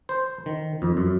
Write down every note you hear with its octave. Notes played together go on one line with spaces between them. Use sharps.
C5
D#3
F2
F#2